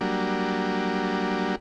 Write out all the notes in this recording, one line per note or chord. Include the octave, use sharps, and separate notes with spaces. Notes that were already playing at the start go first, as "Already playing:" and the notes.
F#3 G3 A#3 D4